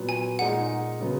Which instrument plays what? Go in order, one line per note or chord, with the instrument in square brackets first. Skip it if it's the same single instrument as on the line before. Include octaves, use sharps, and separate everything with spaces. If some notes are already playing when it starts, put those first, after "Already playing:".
Already playing: [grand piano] A#2 F#3 B3
[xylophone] G#5
[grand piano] A#2 G#3 D#4 G#4 [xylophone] F#5
[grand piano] C#3 F#3 B3